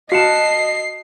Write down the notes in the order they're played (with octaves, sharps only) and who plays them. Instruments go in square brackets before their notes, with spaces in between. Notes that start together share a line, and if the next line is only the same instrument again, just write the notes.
[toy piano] F#4 [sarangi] D#5 [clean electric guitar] F5 F#5 A5 [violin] C7